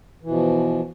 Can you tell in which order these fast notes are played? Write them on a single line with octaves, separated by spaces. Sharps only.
E3 B2 F3